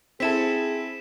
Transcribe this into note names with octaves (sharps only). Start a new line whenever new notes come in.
C4 E4 G#4 A4 B6 E7